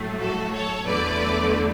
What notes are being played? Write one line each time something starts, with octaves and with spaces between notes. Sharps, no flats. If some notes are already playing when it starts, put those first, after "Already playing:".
Already playing: A2 F#3 A3
F#4 A4
A4 C#5
E2 D3 F#3 A3 B4 D5